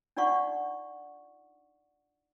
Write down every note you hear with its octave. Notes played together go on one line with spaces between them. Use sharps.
D4 D#4 F4 D5 F#5 C#6